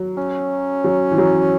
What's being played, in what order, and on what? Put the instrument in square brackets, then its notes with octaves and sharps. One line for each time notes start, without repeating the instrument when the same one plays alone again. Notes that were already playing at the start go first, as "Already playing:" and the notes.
Already playing: [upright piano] F#3
[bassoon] C#4
[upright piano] F#3
E3
F#3